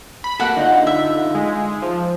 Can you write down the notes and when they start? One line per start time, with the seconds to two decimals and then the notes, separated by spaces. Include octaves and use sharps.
0.24 B5
0.40 A#3 F#4 A4 F#5
0.57 D3 D#4 F4
0.87 E5
1.35 G#3
1.82 F3